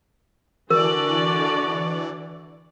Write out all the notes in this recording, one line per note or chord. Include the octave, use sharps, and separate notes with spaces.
D3 E3 F#4 A#4 D5